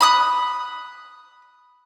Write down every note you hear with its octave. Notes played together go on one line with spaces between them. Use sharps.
B5 D#6 F#6